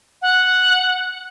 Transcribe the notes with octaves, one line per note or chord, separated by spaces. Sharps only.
F#5